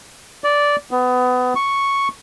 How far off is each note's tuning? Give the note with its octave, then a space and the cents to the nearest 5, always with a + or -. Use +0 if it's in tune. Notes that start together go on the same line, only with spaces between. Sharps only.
D5 -10
B3 +25
C#6 +0